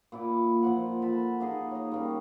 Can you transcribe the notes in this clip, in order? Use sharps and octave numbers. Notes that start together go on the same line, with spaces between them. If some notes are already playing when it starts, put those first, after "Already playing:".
A#2 E4 D6
A#2 F3 F#5
A4 F#5 A5 B5
A#3 D#4 G#4
C#5 D#5
G3 A#3 C#4